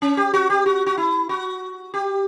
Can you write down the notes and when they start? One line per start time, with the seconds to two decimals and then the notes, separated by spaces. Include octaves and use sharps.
0.02 C#4
0.17 G4
0.34 F#4
0.50 G4
0.66 F#4
0.86 F#4
0.97 E4
1.29 F#4
1.94 G4